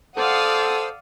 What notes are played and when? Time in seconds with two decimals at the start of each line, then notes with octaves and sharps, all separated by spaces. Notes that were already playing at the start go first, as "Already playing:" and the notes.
0.17 A4 C5 D5 F5 F#5 D#6 E6